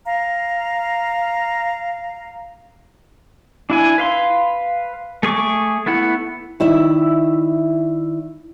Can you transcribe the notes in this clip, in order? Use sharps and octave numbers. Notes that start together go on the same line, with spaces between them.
F5 A#5
D4 E4 G#5
B4 F5 C6
A3 G#4 C#6 D6
A3 B3 E4 F#5
D#3 E4 D5 E5